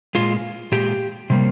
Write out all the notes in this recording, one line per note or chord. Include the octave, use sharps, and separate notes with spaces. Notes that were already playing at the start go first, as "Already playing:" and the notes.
A#2 G#3 F4
A#2 G#3 G4
C3 G3 A#3